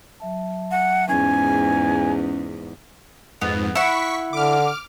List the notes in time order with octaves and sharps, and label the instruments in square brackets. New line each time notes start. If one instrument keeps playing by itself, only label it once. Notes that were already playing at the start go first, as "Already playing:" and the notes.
[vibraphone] F#3 E5 A5
[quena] F#5
[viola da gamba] E2 G#2 [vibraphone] C#4 [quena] G#5
[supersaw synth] F2 G#2 [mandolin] B3
[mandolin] E4 F#5 [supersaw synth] C#6 B6
[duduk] D3 [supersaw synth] D6 F6